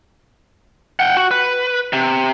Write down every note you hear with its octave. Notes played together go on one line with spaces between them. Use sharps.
F#5 G5
F#4
B4
C3